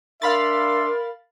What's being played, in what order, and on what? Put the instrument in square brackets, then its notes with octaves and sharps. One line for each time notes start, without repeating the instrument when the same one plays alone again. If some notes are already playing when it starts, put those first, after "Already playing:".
[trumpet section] D4 C6 [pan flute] A#4 [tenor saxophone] E5 [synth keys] F5 B5 A6